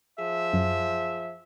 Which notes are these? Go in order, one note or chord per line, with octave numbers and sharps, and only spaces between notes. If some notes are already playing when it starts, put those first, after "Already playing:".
F3 G#4 E5
F#2